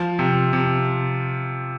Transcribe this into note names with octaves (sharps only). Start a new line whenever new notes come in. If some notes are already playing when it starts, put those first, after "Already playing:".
Already playing: F3
C3
C3